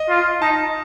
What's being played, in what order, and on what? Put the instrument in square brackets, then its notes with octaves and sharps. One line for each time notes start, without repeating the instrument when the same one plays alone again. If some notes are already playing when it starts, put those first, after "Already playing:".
Already playing: [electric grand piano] D#5
[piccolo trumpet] F4
[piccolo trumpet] D#4 [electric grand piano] A5